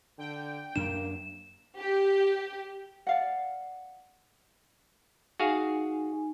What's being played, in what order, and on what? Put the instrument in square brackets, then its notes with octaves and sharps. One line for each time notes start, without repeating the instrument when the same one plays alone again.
[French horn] D3 [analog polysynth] G5
[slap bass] F#2 D4 [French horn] A#3 [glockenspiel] E7
[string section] G4
[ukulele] D5 F5 F#5
[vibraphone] D#4 G#5 [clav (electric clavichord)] F#4 G#4 F5